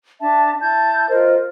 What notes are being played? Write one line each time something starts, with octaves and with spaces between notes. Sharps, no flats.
D4 E5 A5
E4 A5 G6
F4 A#4 C5 D#5